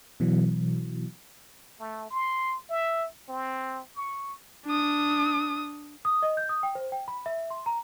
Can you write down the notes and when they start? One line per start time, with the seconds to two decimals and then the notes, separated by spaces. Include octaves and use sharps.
0.20 B2 E3 F#3
1.80 A3
2.10 C6
2.70 E5
3.29 C4
3.96 C#6
4.66 D4 D#6
6.05 D#6
6.22 D#5
6.37 G6
6.49 D#6
6.63 G5
6.75 C5
6.92 G5
7.08 B5
7.26 E5
7.51 C6
7.66 A#5